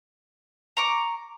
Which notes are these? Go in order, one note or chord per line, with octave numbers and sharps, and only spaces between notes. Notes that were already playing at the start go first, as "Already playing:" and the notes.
A#5 C#6 D6